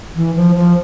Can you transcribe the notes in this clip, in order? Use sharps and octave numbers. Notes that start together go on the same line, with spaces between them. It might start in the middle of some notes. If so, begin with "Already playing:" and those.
E3
F3
F3